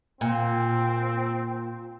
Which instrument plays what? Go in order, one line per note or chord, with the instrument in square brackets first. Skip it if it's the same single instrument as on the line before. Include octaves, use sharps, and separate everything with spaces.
[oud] A#2 [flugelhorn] C4